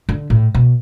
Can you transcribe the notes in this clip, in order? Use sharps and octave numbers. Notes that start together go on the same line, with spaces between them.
D3
A2
B2